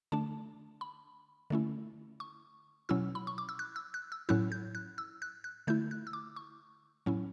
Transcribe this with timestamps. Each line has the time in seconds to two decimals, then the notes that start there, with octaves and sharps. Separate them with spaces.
0.12 D3 A3 D4 A5
0.81 B5
1.50 D3 A3 C#4 E4
2.20 C#6
2.89 B2 F#3 C#4 E4 E6
3.15 B5
3.27 C#6
3.38 D6
3.49 E6
3.59 F#6
3.76 E6
3.94 F#6
4.12 E6
4.29 A2 F#3 C#4 E4 F#6
4.52 G6
4.75 F#6
4.98 E6
5.22 F#6
5.44 F#6
5.67 D3 A3 E4 G6
5.91 F#6
6.07 E6
6.13 D6
6.36 C#6
7.06 A2 F#3 C#4 E4